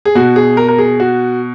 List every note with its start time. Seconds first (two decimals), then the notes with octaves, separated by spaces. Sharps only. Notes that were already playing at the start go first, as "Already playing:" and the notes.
0.05 G#4
0.15 B2 F#4
0.36 G#4
0.57 A#4
0.68 A#4
0.78 G#4
1.00 F#4